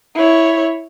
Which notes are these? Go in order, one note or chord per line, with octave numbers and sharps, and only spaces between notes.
E4 C#5